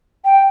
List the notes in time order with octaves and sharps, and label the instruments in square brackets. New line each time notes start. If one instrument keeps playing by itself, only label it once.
[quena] G5